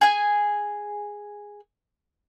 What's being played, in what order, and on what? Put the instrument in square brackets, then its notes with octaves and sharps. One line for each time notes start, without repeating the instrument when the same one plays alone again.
[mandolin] G#4 G#5